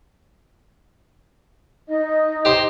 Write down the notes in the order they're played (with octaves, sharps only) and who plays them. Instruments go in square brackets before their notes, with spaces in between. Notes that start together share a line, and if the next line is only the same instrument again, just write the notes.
[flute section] D#4 D#5
[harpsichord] G4 C5